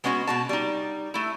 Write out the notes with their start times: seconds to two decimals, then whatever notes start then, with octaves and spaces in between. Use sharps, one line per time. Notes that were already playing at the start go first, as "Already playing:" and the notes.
0.04 G#3 B3 C#4 F4 F#4
0.27 B2 F#4 A5
0.49 G3 D#4
1.14 A3 E4